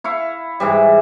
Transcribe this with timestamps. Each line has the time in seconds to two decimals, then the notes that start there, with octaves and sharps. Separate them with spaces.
0.04 E4 F5 C#6
0.60 G#2 E3 G3